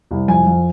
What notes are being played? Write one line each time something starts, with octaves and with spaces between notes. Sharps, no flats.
C2
F2 G#5
F2